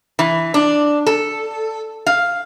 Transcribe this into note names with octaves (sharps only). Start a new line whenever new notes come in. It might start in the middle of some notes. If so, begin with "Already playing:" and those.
E3
D4
A4
F5